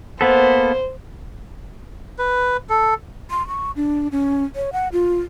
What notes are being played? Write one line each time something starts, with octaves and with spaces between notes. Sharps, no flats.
A#3 B3 A4 C5
B4
A4
C6
C#6
D4
C#4
C#5
F#5
F4